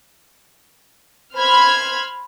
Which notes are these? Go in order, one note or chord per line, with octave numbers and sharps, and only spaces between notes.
C5 B5 F6 G#6